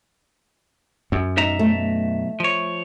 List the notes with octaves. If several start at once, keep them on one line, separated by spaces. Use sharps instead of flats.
F#2
B1 D#4 E5 A#5
A3
F3 C#5